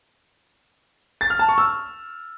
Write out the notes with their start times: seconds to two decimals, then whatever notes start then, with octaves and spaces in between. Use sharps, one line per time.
1.21 A6
1.30 F6
1.39 A5
1.49 C#6
1.58 E6